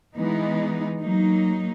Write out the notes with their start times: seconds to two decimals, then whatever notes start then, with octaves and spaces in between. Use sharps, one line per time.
0.15 E3 G#3 B3 D#4
1.00 F#3 A#3 D#4